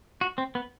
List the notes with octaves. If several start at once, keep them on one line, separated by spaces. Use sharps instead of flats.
F#4
C4
B3